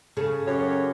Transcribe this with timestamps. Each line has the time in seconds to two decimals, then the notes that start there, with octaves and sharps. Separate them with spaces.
0.17 C#3 G#4 A4
0.46 F#2 G4 C#5